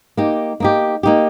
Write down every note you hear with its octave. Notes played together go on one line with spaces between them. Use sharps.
A#3 D#4 G4
A#3 D#4 G4
A#3 D#4 G4